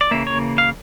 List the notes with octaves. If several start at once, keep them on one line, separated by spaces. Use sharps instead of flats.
D5
C#3 E3 A#3 E5
C#5
F5